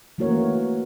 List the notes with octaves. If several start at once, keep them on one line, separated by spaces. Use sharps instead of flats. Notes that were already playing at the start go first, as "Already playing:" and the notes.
E3 A3 A#3 F#4 A#4 C#5